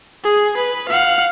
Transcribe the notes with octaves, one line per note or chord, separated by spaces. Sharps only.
G#4
B4
F5 F#5